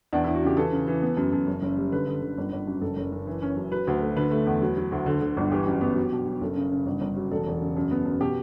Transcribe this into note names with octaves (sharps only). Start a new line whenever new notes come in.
E2 D4
E2 E4
F#4
C#3 G4
E3 A4
C#3
E3
B3
F#2
F#2
F#1
F#1
G3
D3 B4
D3
D3
G1
G1
F#2
F#1 A4
F#1
F#1
E3
C#4
F#2
F#3 B4
D2
A3
D3 B4
A3
E2
F#3
F#3
D2
D3
D3
G1
E3 G4
F#2
B3
F#3
B2
F#3
F#1 A4
C#3
C#3
G1
G1
F#3
E1 A4
E1
C#3
F#2
B3
F#2
B2 G4